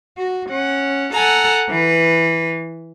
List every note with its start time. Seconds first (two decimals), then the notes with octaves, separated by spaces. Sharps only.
0.17 F#4
0.49 C#4 F#5
1.12 A4 F#5 G#5 A#5
1.68 E3 B4